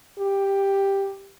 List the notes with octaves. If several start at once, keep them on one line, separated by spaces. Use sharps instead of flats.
G4